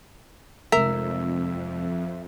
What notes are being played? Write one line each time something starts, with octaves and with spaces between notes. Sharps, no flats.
F1 F2 G#3 A#4 E5